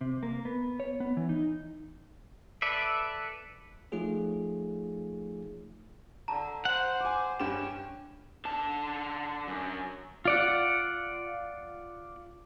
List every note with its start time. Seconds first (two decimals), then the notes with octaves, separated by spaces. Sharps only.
0.01 C3
0.23 A#3
0.45 B3
0.80 C#5
1.00 B3
1.17 E3
1.29 D#4
2.62 A4 B4 D5 E5
3.92 F3 A3 D#4 F4 G#4 C#5
6.28 D3 A5 A#5
6.65 C5 F#5
7.01 G#5 D6
7.40 G2 C#4 G4 E7
8.45 D3 A5
9.47 F#2
10.25 F4 D5 F#5